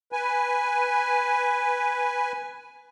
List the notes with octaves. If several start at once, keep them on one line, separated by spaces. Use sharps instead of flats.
B4 G#5